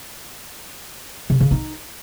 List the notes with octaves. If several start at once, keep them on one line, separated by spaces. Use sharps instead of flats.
C#3
C#3
D#4